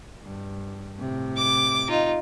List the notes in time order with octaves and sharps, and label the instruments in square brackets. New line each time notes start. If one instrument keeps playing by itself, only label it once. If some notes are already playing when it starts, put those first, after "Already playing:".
[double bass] G2
A2 C3
[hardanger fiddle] D6
D#4 F4